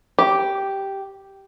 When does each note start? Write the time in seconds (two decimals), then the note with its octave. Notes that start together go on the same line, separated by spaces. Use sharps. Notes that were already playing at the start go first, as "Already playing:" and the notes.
0.19 G4